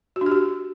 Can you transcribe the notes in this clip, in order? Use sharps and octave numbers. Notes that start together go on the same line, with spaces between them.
F#4
D4
G4
F#4